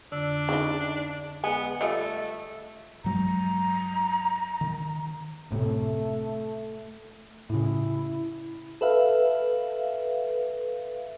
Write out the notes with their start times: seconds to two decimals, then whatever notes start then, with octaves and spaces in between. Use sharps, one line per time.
0.12 F2 D3 D4 E6
0.49 C#3 D#4 F4 D#5
1.44 G#3 B3 G#5
1.81 G3 A3 F4 D#5
3.04 G2 F#3 G#3 A#5
4.61 D#3
5.51 F#1 A2 C3 A3
7.50 A2 C#3 E4
8.81 A4 B4 E5 F5